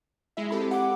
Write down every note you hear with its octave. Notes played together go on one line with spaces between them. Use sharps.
G#3 E4 E5
C4 G4 A4 B5
F#5 D6